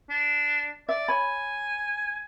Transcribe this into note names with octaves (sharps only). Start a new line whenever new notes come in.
D4
D5 E5
C#5 G#5 B5